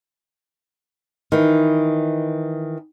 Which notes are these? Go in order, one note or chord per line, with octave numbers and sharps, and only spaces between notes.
D#3 E3